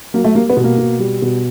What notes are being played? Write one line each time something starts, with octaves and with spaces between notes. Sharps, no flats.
F#3 A#3
A3
G3 A#3
B3
B2
A#3
B2
G3
B2